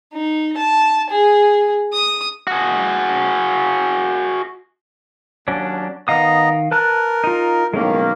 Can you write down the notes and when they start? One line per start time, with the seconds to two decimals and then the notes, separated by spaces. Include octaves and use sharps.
0.14 D#4
0.57 A5
1.10 G#4
1.93 D#6
2.47 F#4 G#4
5.48 D#2 F#3 C#4 D4
6.08 D#3 B3 D#5 F5 A#5 D#6
6.71 A#4 B4 A5 F#6
7.24 D#4 F4
7.74 B1 A2 D#3 G#3 A#3 C#4